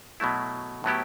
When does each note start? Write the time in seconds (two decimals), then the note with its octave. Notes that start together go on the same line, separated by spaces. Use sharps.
0.20 B2 F#3 A3 E4
0.84 A2 F#3 B3 E4 G4